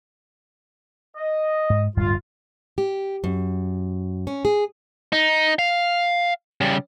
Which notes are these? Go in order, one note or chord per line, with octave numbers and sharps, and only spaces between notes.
D#5
G#2
D1 G2 G3 F4
G4
F#2
C#4
G#4
D#4
F5
C#3 G3